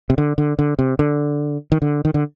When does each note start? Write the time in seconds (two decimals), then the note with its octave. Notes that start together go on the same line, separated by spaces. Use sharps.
0.10 C3
0.18 D3
0.38 D3
0.59 D3
0.79 C3
0.99 D3
1.72 D#3
1.82 D3
2.05 D#3
2.14 D3